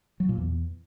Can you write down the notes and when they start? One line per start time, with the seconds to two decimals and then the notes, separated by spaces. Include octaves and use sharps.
0.20 F#3
0.29 A#2
0.38 E2